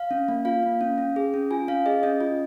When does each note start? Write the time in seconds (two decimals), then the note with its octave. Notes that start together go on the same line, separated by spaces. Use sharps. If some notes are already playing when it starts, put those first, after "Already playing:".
Already playing: F5
0.11 C#4
0.28 A#3
0.45 F4 F5
0.63 A#3
0.81 C#4
0.98 C#4
1.16 G#4
1.34 C#4
1.51 F4 G#5
1.68 C#4 F5
1.86 G#4 D#5
2.03 C#4 D#5
2.21 F4